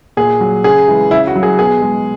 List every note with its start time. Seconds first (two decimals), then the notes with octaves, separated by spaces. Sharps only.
0.17 A#2 G#4
0.40 F#3
0.64 C#3 G#4
0.88 E3 G#3
1.11 C#3 E4
1.27 F#4
1.36 F#3
1.43 G#4
1.59 B2 G#4
1.82 G#3